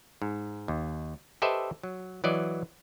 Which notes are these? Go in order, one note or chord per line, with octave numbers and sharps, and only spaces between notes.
G#2
D#2
G4 A4 B4 C5 D#5 E5
F#3
E3 F#3 D5 D#5